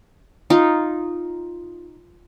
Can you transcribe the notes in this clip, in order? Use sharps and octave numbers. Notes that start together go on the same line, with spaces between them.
D#4 F4